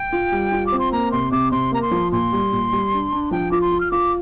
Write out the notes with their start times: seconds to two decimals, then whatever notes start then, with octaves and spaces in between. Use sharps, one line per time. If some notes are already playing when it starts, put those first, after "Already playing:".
Already playing: G5
0.13 F4
0.32 G3
0.52 F4
0.66 D6
0.72 C4
0.79 C6
0.92 A#3 A#5
1.12 C3 C6
1.31 C3 D6
1.51 C3 C6
1.72 A#3 A#5
1.82 C6
1.91 F3
2.12 A#2 C6
2.32 G3
2.52 A#2
2.72 G3
2.92 D4
3.12 D4
3.31 F3 G5
3.51 F4 D6
3.61 C6
3.72 F4
3.80 F6
3.91 F4 D6